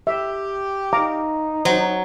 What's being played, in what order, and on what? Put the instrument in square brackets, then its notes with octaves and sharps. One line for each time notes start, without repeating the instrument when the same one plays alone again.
[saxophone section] G4 [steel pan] E5
[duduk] D#4 [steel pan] F5 A#5 D6
[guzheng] F#3 [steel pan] C5